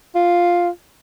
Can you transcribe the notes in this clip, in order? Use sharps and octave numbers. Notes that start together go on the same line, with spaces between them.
F4